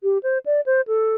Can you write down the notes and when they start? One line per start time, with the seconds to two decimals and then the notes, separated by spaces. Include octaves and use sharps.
0.03 G4
0.23 C5
0.46 D5
0.66 C5
0.88 A4